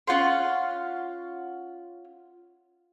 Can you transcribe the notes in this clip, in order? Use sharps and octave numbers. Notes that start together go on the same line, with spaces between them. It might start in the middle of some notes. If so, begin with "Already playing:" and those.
C#4 F4 F#5 C6